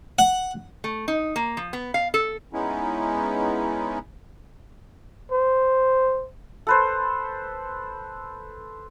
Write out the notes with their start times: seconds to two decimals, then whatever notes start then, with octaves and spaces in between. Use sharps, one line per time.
0.19 F#5
0.84 A3
1.08 D#4
1.36 A#3
1.57 F3
1.73 B3
1.94 F5
2.14 A4
2.53 G#3 B3 C#4 D#4 E4
5.31 C5
6.67 A4 B4 C5